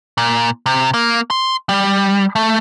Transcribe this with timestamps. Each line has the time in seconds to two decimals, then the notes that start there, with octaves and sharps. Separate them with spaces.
0.18 A#2
0.66 C3
0.94 A#3
1.30 C6
1.69 G3
2.36 A3